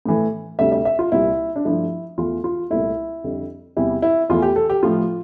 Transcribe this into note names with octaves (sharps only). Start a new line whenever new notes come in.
A2 E3 A3
D2 C3 G3 E5
E5
E5
F4
C2 A#2 G3 E4
D4
G2 F3 A3 E4
E2 E3 A3 F4
F4
C2 A#2 A3 E4
F2 D3 G3
E2 C3 G3 E4
E4
E2 E3 A3 F4
G4
A4
G4
A2 F3 A3 F4